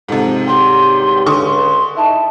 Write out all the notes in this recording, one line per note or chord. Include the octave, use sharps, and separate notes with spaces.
F2 G#2 C3
G2 F#3 G4 C6
C#2 D3 C#6 D#6
C6
D#4 E4 A5